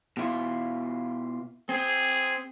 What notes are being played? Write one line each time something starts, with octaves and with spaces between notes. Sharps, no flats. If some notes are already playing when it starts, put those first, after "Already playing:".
B2 E4 F4
C4 G#4